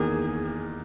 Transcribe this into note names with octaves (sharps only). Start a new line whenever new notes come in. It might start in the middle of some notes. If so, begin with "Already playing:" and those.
Already playing: E2 D#3 A#3 G#4